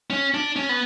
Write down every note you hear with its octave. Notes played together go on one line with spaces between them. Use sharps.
C#4
D4
C#4
B3